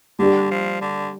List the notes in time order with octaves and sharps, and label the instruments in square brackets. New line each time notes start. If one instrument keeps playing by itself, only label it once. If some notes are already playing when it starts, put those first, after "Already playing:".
[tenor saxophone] D3 [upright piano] G3 D4 G4
[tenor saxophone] F3
D3